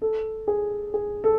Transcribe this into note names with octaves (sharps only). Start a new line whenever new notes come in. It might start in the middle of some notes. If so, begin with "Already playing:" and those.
A4
G#4
G#4
A4